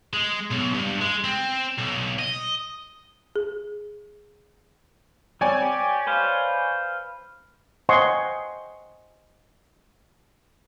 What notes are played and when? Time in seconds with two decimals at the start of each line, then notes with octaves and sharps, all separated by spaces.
0.14 G#3
0.51 B1
0.74 G2
1.01 G#3
1.24 C4
1.78 B1
2.19 D#5
3.36 G#4
5.41 G3 C4 C#5 D5 G#5
5.62 G4
6.07 B4 C5 F5
7.89 C5 D#5 F#5 G#5 C6 C#6